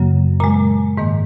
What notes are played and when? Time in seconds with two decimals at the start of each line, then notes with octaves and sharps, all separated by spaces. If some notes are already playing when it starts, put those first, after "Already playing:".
Already playing: F#2 C#3 F#3 A#3
0.40 A#2 G#3 A#5
0.97 G#2 D#3 A#3